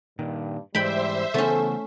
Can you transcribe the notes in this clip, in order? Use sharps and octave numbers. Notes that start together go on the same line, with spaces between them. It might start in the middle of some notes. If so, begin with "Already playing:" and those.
G2 A#2 D#3
G#2 E3 G3 G#3 C5 E5 G5 B5
C#3 E3 A3 B3 C#4 A4